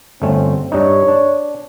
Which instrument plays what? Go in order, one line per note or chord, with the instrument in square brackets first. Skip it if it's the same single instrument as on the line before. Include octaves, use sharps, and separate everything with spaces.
[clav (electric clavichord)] G1 A3 C#4 [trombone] C4
[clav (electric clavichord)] G2 D4 D#4 [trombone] C#5
[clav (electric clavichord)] D4